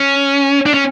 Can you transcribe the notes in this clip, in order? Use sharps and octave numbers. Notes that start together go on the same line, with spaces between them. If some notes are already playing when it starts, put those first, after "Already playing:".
Already playing: C#4
D4
C#4